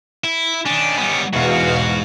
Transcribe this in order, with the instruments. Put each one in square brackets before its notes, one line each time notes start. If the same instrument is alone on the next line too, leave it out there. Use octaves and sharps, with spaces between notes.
[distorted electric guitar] E4
[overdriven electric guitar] D#3 C#4 [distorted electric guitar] D4
[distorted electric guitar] G3 B3
[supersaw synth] E2 B2 F5 [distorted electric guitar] G#2 [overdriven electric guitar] F#4